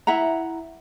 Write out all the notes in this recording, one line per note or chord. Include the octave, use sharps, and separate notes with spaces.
E4 E5 F#5 A#5